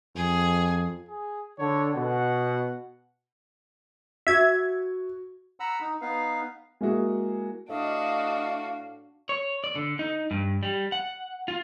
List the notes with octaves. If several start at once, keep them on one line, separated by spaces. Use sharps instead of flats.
F2 G#4
G#4
D3 C#5
B2 F#5
F#4 E5 G#6
F#5 A#5 B5 E6
D#4
B3 D#4 B4 F5
G#3 A#3 E4 F#4 G#4
A2 D4 F#4 D#5 F5
C#5
D5
D3
D#4
G2
G3
F#5
F4